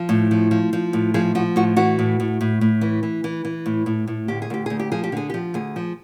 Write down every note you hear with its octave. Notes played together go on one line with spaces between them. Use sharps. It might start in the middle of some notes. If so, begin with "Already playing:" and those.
Already playing: F3
A2
F3
F3
F3
A2
F3 G#4
F3 F#4
A2 F#4
E3 F#4
A2
A2
A2
A2
E3
E3
E3
E3
A2
A2
A2
D2 G4
G#4
D2 G4
D2 G#4
G4
F3 G#4
G4
D3 G#4
G4
F3
D2 G#4
F3